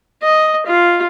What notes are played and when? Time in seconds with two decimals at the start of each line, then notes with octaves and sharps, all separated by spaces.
0.23 D#5
0.66 F4